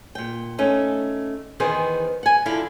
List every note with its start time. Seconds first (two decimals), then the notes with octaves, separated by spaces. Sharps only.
0.15 A#2 G5
0.58 A3 C#4 D#4
1.60 E2 D#3 B3 G#4 C5
2.23 F#5 G#5
2.46 D3 F3 D4 E4 E5 F5